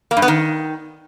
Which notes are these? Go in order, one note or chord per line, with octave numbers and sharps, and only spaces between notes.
A#3
G2
B3
D#3